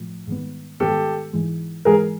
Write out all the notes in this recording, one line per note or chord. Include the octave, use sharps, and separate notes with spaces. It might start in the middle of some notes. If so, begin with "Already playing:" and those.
Already playing: A2 F3 A3
G#2 D#3 G3 B3
G#2 D#3 G3 B3 G4 A4
G#2 E3 G#3
G#2 E3 G#3 G#4 A#4